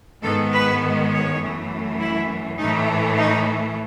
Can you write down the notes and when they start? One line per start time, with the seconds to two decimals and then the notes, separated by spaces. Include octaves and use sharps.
0.22 G#2 D#3 G#3 B3 A4
0.52 B4
1.10 C#5
1.40 F#2 E3 A3
1.99 E4
2.58 A2 E3 A3 D#4
3.17 D#4